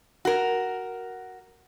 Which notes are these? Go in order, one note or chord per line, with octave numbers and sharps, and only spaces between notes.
F#4 A#4